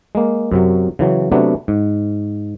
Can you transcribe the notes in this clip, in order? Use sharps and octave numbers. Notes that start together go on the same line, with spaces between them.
G#3 A#3
F#2 C3 F#3
C#3 E3 F#3
C3 F#3 A3 B3 D4
G#2